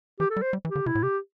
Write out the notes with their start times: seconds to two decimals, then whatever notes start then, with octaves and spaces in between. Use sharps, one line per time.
0.20 E3 G4
0.30 A4
0.37 G3
0.42 C5
0.53 G3
0.65 E3
0.69 G4
0.76 D3
0.86 C3 E4
0.95 A2
1.03 C3 G4